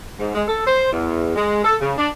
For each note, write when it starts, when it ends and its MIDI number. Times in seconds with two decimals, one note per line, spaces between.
0.19 0.31 44
0.34 0.43 56
0.47 0.64 69
0.66 0.89 72
0.91 1.34 40
1.35 1.63 56
1.64 1.76 69
1.80 1.92 49
1.98 2.08 62